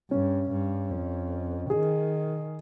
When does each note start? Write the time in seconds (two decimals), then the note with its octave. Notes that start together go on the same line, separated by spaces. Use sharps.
0.11 G2 C#4
0.51 G2
0.91 F2
1.70 D#3 G#4